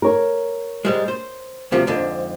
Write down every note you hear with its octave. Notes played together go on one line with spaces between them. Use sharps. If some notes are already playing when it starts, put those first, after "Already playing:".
A#4 C#5
G#2 G3 G#3
C5
D2 C3 F3
F2 G#2 D3